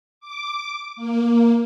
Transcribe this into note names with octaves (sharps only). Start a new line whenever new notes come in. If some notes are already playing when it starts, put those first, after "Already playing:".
D6
A#3